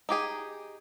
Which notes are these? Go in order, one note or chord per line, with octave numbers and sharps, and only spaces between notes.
D#4 G4 G#4